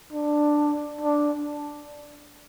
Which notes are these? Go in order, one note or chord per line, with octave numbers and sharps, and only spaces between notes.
D4
D4